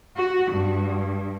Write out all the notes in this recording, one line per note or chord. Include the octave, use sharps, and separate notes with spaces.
F#4
G2